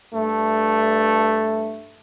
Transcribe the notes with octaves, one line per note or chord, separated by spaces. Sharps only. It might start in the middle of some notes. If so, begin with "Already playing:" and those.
G2 A3